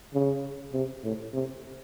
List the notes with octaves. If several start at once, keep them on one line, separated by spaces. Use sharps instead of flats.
C#3
C3
A2
C3